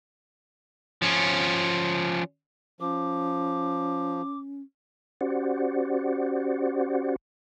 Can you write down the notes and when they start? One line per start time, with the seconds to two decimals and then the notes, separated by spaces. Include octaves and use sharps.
1.02 F3 C#4
2.80 F3 C#4 D6
5.21 C#4 F#4 G4 C5 D5 F#5